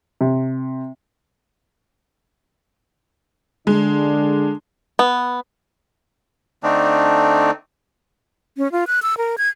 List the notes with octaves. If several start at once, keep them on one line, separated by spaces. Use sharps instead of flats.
C3
D3 G#3 D4
B3
D3 A3 C4 D4 D#4
C#4
F4
F#6
E6
A#4
G#6